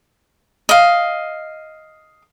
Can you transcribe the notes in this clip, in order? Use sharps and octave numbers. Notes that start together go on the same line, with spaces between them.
D#5 F5